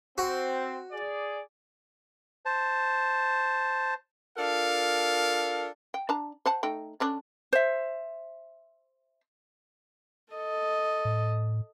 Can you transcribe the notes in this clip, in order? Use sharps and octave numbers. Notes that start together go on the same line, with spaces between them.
C4 F#4
G#4 D5
C5 A5
D4 F4 A4 A#4 F5
G5
D4 A5 A#5
C5 F#5 A5
A3 D#4 G5
D3 C#4 D4
C5 E5
A4 D#5
A2